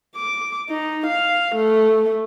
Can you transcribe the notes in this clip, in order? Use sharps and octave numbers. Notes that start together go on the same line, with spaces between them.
D6
D#4
F5
A3